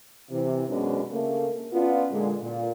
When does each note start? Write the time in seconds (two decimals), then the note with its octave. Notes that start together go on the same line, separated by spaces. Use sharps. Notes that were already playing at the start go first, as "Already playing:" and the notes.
0.30 C3 E3
0.69 F#2 B2 G#3 B3 C#4 D4
1.11 C#3 A3 A#3
1.72 B3 C#4 D4 F4
2.12 A#2 D3 G#3
2.42 A#2